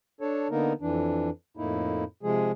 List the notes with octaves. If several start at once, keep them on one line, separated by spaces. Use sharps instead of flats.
D4 A4 C#5
D3 A#3 B3 D#4 A#4
F2 E3 D4
F2 A2 A#3 D#4 E4
C3 F3 G#3 G#4